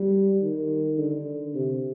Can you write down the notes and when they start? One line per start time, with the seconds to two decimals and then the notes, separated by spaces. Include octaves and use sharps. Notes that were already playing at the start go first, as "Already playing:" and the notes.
Already playing: G3
0.42 D#3
0.98 D3
1.54 C3